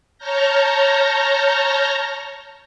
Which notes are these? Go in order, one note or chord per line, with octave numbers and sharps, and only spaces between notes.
C#5 A5 A#5 F6 G6 A#6